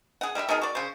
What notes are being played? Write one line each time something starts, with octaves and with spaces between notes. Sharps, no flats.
G#4 F#5
G3 G4 A#4 E5
B2 D#4 G#4 A#4
F#4 D5
C#3 C5